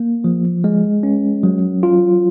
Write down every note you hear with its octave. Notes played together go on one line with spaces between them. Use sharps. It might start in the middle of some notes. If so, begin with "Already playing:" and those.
Already playing: A#3
F3
G#3
C#4
F#3
F4